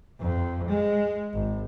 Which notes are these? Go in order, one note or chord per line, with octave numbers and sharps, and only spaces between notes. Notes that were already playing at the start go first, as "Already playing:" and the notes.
F2
G#3
G#1